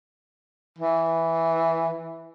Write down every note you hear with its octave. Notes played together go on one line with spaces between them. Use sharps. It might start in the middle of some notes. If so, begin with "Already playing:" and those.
E3